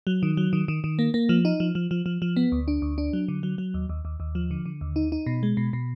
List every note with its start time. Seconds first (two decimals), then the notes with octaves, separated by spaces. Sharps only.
0.07 F#3
0.23 D#3
0.37 F#3
0.53 D#3
0.68 D#3
0.84 D#3
0.99 A#3
1.14 A#3
1.29 F3
1.45 D#4
1.60 F3
1.75 F3
1.91 F3
2.06 F3
2.22 F3
2.36 B3
2.52 D2
2.68 D4
2.82 D2
2.98 D4
3.13 F#3
3.28 D3
3.43 F#3
3.58 F#3
3.74 D#2
3.89 D#2
4.05 D#2
4.20 D#2
4.35 F3
4.51 D3
4.65 D3
4.81 D#2
4.96 D#4
5.12 D#4
5.26 B2
5.43 G#3
5.57 B2
5.73 B2